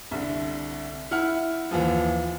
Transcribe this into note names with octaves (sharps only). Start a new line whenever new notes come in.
C2 D3
E4 F#5 F6
D#2 E3 F3